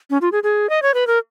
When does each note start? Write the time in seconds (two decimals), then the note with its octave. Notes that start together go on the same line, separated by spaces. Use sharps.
0.10 C#4
0.22 F4
0.32 G#4
0.43 G#4
0.70 D#5
0.82 C#5
0.94 B4
1.07 A#4